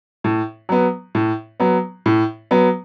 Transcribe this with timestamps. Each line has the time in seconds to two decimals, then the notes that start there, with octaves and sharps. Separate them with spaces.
0.24 A2
0.69 F#3 B3
1.15 A2
1.60 F#3 B3
2.06 A2
2.51 F#3 B3